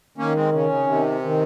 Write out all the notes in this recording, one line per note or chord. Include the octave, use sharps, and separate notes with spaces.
D#3 A#3 C#4
G#3 C4
C#3 C#4
C#3
C3 D#3
D#3